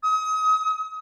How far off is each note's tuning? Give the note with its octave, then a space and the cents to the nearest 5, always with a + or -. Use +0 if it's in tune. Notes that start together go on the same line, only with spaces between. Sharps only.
D#6 +35